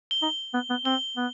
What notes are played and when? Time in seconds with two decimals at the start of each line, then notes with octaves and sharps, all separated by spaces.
0.11 G7
0.23 D#4
0.54 B3
0.70 B3
0.85 C4 G7
1.17 B3